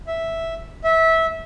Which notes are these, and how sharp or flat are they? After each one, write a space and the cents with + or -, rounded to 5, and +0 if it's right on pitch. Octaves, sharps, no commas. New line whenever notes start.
E5 -5
E5 -20